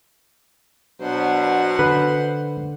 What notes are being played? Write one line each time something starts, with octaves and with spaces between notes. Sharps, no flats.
B2 F#3 D4 C5 F#5
D3 B4